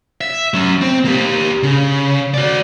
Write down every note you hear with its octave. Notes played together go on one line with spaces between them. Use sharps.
E5
F#3 C#4
C4
A#3 G4
C#3
F#4 D5